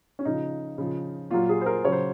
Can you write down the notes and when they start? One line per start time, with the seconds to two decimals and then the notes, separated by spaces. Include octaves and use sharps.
0.19 C#4
0.25 C#3 F3 D#4
0.78 C#3 F3
1.31 A#2 F#3 F4
1.49 G#4
1.61 C5
1.66 A#4
1.84 C#3 F#3 C#5
1.92 C5